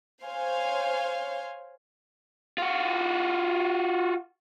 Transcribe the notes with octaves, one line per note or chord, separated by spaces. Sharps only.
C5 C#5 F5 G#5 C6
F4 F#4